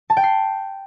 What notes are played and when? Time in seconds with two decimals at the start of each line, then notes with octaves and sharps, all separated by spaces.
0.10 A5
0.17 G5
0.24 C7